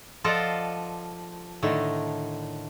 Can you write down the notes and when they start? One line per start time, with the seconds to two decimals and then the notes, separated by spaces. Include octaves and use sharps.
0.24 F3 F4 A4 D5 D#5 F#5
1.63 A2 D3 D#3 A3